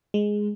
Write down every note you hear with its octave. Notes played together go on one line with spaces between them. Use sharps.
G#3